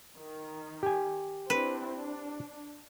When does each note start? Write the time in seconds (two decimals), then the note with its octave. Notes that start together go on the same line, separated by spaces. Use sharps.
0.17 D#3
0.83 G4 G#5
1.50 C4 D4 E4 B4
1.92 D4